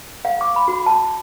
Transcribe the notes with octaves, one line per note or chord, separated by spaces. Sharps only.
F5
D6
B5
F#4
A5